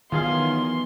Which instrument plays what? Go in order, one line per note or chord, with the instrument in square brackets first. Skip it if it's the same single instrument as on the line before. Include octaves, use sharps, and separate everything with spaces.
[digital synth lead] D#3 [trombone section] E3 F#3 B3 [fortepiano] F4 G#4 F5 [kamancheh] C6